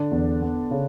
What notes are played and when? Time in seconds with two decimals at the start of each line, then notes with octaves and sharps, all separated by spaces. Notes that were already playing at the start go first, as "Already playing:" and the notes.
Already playing: D3 D4
0.12 E2
0.42 B3
0.71 C#3